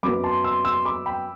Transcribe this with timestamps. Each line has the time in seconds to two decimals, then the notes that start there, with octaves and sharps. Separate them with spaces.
0.03 F#2 F#3 B3 B5 D6
0.24 A5 C6
0.44 C6 E6
0.65 C6 E6
0.85 B5 D6
1.06 G5 B5